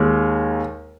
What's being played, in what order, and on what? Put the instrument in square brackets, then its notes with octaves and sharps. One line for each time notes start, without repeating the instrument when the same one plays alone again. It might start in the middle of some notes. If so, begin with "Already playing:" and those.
Already playing: [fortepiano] D#2 D#3 G#3